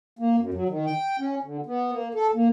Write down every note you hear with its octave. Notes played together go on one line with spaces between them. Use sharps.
A#3
F#2
F#3
D#3
G5
C#4
D3
B3
A#3
A4
A#3